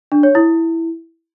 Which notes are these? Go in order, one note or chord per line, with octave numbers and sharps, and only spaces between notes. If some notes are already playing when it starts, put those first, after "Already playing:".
D4
C#5
E4